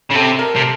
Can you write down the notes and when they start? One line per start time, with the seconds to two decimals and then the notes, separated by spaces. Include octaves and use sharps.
0.10 C#3
0.14 C3 A4
0.39 A#4
0.56 C3